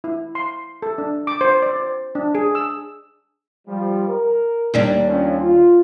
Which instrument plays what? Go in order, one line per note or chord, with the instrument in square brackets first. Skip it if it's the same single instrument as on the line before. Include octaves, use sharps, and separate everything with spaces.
[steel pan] E4
C6
A4
D4
D6
C5
D5
C5
D4
G#4
E6
[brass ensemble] F3 G3
A#4
[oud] D#2 G3 D4
[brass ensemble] F2 C#4
F4